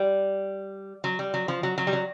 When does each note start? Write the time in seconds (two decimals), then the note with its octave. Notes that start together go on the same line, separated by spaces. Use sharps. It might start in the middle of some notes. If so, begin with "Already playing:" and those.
Already playing: G3
1.04 F#3
1.19 G3
1.34 F#3
1.48 F3
1.63 F#3
1.78 F#3
1.87 G3
1.93 F#3